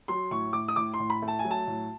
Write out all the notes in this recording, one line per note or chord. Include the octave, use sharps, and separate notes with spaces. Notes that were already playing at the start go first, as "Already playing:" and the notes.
F#3 C6
A2 C#6
A2 D6
D#6
A2 D6
C6
A2
B5
A3
A5
G#5
F#3
A5
A2